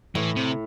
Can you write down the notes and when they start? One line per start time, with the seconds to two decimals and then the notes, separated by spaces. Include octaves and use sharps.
0.15 A2 E3
0.36 C3